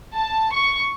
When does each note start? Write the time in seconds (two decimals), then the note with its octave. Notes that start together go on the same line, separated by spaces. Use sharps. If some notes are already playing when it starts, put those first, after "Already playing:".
0.15 A5
0.53 C#6